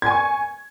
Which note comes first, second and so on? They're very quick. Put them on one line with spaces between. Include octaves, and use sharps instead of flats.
G#6 G#5 C#6